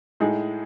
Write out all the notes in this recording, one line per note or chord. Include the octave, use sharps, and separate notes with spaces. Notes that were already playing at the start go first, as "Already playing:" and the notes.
A2 G#3 D#4 G#4